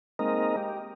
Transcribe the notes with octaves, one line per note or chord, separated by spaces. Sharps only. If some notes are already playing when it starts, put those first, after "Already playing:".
G#3 A#3 C4 D#4 A#4 D#5
G4